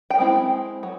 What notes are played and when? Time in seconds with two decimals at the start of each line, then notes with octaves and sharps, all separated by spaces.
0.10 G5
0.19 G#3 C4 E4
0.83 F#3